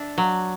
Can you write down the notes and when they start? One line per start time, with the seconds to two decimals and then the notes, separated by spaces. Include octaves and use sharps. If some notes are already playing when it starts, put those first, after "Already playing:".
Already playing: D4 E5
0.18 F#3